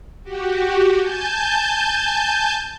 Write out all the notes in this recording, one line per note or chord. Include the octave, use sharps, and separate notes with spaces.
F#4 G4
G#5 A5 G6